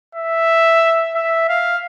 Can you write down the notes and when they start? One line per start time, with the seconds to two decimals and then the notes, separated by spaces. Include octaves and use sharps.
0.16 E5
1.15 E5
1.49 F5